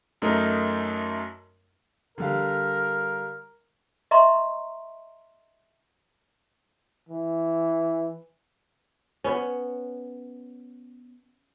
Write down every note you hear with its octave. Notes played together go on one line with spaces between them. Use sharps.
F#2 A3 D#4 A#4
D3 G3 A#4 F5
D#5 E5 A#5 C6 C#6
E3
B3 C#4